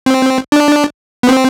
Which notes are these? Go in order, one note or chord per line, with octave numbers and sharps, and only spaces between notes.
C4
D4
B3
C4